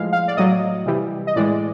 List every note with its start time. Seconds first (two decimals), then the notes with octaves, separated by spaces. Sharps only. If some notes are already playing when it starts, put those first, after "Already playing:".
Already playing: A2 F3 G#3 F5
0.13 F5
0.28 D5
0.37 A2 F#3 D#5
0.86 C3 E3 G3
1.27 D#5
1.36 A2 E3 G#3 D5